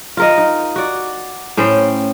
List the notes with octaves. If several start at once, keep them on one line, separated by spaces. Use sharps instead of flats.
F4 A#4 D#5
D#4
F#4 D5
A2 C#4 C5 G5